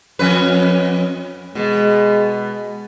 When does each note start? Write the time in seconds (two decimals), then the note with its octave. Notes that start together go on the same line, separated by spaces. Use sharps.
0.19 F2 C#4 B4
1.55 B2 G#3 B3